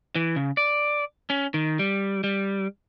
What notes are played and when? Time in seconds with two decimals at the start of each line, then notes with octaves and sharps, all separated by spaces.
0.15 E3
0.36 C#3
0.57 D5
1.30 C#4
1.54 D#3
1.79 G3
2.24 G3